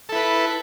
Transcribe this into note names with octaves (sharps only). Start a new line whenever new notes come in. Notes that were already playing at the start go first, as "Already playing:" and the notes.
E4 A4 B4